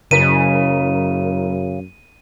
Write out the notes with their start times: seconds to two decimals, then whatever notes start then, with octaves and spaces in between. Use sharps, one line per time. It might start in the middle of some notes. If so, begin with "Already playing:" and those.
0.11 F#1 F#2 C#3 A#4 B6 D#7